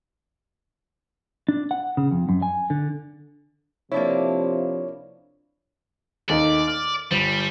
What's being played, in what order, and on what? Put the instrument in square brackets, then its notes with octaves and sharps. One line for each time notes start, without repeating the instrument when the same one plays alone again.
[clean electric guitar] D4
F#5
C#3
F2
F#2
G#5
D3
[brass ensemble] C3 F3 [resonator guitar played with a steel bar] A#3 D4 E4 [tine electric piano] C#5
[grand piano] D#2 A3 D#4 [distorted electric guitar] D5
[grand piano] F6
[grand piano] G1 [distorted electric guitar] G3